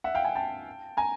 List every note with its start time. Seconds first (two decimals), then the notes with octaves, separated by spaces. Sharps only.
0.04 E5 F#5
0.15 F5 G5
0.25 F#5 G#5
0.35 G5 A5
0.97 G#5 A#5